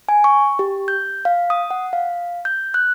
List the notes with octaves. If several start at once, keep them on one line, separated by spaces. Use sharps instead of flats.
G#5
C#6
G4
G6
F5
D#6
F#5
F5
G6
F#6